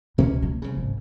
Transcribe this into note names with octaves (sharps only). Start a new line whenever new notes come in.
C#2 B2 A#3 C#4
A3
C2 C#3
G1 G#2